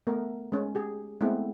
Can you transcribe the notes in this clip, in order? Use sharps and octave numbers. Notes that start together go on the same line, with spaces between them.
A3 B3 A#4
G#3 C#4
G4 G#4
G#3 A3 B3 C4 E4 A4